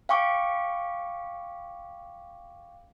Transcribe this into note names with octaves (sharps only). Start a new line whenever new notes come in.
F5 G5 C#6 D6